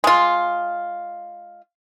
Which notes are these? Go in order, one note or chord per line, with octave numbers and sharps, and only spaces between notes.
G#3 F4